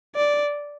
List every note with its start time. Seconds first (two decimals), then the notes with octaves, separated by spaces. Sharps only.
0.16 D5